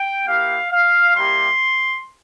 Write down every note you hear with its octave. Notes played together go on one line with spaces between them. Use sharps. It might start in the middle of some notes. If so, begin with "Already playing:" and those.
Already playing: G5
A#3 E4 G4 F5
F5
G3 A#3 E4 G4 C6